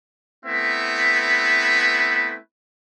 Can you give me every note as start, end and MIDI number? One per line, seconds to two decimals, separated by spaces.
0.46 2.37 57
0.46 2.37 59
0.46 2.37 60
0.46 2.37 64
0.46 2.37 71
0.46 2.37 76